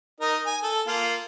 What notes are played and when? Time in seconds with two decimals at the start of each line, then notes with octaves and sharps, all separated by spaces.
0.20 D#4 A#4 D#5
0.46 G#5
0.63 A4
0.87 A#3 F4